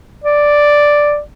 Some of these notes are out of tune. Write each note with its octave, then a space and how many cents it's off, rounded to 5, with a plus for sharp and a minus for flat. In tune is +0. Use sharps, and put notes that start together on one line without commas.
D5 +0